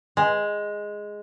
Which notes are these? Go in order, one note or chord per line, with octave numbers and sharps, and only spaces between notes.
G#3